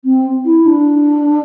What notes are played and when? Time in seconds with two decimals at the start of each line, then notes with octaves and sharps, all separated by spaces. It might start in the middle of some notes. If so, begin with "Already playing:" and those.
0.04 C4
0.45 E4
0.66 D4